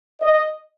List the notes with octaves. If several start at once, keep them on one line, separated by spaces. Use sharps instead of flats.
D#5